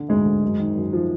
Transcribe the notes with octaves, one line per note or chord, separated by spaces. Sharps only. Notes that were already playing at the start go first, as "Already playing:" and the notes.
Already playing: D3
D2 G#2 G#3
D3
F#2
D#3
F#2
D#3 F3